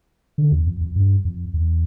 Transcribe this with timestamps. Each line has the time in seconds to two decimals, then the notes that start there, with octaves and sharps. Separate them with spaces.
0.38 D3
0.52 E2
0.67 F2
0.81 F2
0.96 G2
1.25 F2
1.54 E2